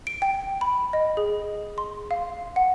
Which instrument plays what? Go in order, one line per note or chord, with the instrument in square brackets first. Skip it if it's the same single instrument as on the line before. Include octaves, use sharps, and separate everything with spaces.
[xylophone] D7
G5
B5
D#5
G#4
C6
F5
F#5